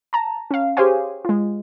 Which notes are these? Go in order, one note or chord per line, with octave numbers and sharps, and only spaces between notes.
A5 A#5
C#4 F5
G4 G#4 C5 C#5 F5 G#5
G#3 F4